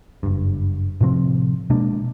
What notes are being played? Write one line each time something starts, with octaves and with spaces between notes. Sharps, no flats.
F#1 G2
A2 C3 F3 C4
B2 G#3 A#3 D4